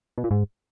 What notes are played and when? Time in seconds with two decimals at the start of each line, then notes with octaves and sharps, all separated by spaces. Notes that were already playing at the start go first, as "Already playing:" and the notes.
0.18 B2
0.24 A#2
0.31 G#2